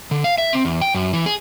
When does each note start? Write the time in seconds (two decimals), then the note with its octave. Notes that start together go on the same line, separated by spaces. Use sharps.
0.11 D3
0.24 F5
0.38 E5
0.53 C4
0.65 E2
0.81 G5
0.95 F#2
1.13 E3
1.26 G#4